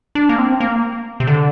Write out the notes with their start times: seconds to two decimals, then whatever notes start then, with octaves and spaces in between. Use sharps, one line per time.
0.15 D4
0.29 A#3
0.38 C4
0.60 A#3
1.20 C3
1.27 D3